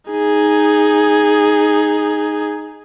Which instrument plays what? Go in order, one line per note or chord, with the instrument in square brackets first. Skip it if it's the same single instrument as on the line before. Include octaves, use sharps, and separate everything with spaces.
[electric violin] D#4 G#4